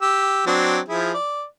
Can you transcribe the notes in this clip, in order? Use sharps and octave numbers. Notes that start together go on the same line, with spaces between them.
G4 E6
F#3 C4 D4
F3 E4 G#4
D5